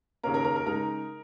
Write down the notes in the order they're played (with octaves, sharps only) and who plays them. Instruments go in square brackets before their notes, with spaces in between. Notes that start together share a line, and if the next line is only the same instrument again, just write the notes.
[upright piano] D#2 C#3 A#3 C#4 A#4 A#5
A#4 A#5
A#4 A#5
A#4 A#5
C#3 G#3 D#4 A#4 A#5